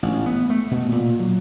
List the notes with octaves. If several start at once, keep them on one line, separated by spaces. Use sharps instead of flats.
A1
B3
A3
B2
A#2
F#3